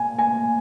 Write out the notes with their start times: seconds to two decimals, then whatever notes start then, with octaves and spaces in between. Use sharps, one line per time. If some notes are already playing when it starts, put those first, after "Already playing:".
Already playing: G#5
0.19 G#5